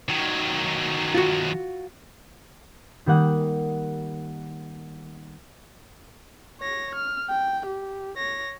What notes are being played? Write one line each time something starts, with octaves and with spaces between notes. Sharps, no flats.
D#3 F#3
F4 F#4
D#3 G3 A#3 F#5 D#6
C#5 A#6
F6
G5
G4
C#5 A#6